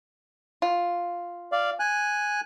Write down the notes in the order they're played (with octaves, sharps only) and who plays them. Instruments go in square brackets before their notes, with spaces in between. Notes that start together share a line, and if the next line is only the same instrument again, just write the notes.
[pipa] F4
[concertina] D5 F5
G#5 F#6